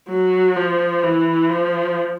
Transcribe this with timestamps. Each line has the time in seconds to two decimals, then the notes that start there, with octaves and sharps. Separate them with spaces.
0.09 F#3
0.56 F3
1.03 E3
1.50 F3